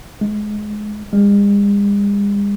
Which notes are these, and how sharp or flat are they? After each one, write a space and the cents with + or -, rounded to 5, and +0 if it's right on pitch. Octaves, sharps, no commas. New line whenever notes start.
G#3 +20
G#3 -45